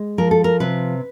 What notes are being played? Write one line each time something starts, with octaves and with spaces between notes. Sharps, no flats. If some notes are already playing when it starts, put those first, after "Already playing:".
Already playing: G#3
F3 A#4
A4
A#4
C3 B4